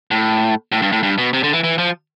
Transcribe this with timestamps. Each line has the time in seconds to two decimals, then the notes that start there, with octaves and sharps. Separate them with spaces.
0.11 A2
0.72 A2
0.82 G2
0.92 A2
1.03 G2
1.18 B2
1.33 C3
1.43 D3
1.54 E3
1.64 E3
1.78 F3